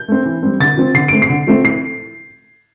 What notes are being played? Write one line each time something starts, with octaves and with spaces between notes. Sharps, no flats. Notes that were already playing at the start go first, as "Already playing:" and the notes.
Already playing: G6
A3 C4
E3
G3 C4
D3 A6
F3 C4
D3 C7
A3 C4 D7
C7
D3
F3 A3 C4
A2 C7